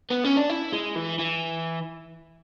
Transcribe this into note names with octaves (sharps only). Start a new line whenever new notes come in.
B3
C#4
D4
E4
G#3
E3
E3